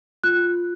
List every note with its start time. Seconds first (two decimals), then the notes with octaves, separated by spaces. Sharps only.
0.24 F4 F#6